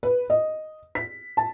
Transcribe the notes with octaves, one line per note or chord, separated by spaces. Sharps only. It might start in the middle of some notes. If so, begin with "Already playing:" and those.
B4
D#5
B6
A5